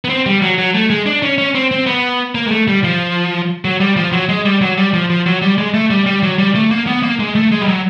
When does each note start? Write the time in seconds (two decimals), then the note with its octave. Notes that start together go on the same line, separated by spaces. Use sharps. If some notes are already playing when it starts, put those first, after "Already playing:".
0.04 B3
0.09 C4
0.26 G3
0.42 F#3
0.58 F#3
0.74 A3
0.90 G#3
1.06 D4
1.23 C#4
1.38 C#4
1.55 C4
1.71 C4
1.86 B3
2.35 A#3
2.47 G#3
2.51 A3
2.68 G3
2.84 F3
3.65 F#3
3.80 G3
3.97 F3
4.12 F#3
4.29 G#3
4.45 G3
4.61 F#3
4.78 G3
4.94 F3
5.10 F3
5.26 F#3
5.42 G3
5.58 G#3
5.74 A3
5.91 G3
6.06 G3
6.23 F#3
6.39 G3
6.55 A3
6.71 A#3
6.87 B3
7.03 A#3
7.20 G#3
7.35 A3
7.52 G#3
7.61 G3
7.68 F#3